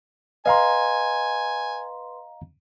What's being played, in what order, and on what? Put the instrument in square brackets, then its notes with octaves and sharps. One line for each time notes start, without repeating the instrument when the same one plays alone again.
[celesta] B4 C6 [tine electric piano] D#5 F5 A#5 [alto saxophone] G#5